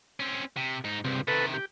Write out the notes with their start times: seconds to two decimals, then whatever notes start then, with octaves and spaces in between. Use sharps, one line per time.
0.20 C4 C#4
0.57 C3
0.84 G#2 D#4
1.05 C#2 G2 C3
1.28 C3 D#3 A4 B4
1.54 G4